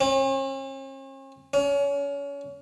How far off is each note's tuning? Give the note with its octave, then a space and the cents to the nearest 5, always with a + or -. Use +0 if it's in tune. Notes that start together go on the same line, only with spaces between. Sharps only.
C#4 -45
C#4 +30